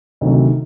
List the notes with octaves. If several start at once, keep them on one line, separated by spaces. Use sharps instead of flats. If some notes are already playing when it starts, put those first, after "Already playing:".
D2 C3 D#3 F#3